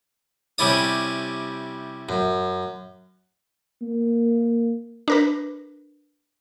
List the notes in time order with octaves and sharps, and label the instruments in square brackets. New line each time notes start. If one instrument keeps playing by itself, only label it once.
[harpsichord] C3 G3 C#4 E4 D5 D#6
F#2
[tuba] A#3
[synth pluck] D4 A#4 B4